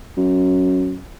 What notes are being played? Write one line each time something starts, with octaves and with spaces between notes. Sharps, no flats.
F#2